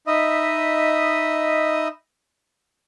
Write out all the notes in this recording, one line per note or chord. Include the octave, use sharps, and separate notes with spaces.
D#4 D#5 E5 B5 D#6